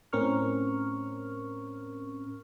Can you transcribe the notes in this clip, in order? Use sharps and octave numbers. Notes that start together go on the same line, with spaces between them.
A2 C4 C#4 A#4 C#6 F6